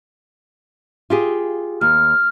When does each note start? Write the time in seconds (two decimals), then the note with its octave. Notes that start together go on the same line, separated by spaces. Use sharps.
1.10 F4 G4 G#4
1.81 D#2 F6